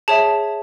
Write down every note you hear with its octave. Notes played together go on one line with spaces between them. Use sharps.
G#4 C#5 E5 A5